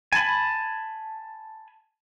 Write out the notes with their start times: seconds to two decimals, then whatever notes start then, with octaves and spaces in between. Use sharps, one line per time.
0.13 G#5 A5 B5